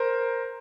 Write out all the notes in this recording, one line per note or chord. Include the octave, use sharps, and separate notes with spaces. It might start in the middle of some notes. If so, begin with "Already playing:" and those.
Already playing: A#4 C5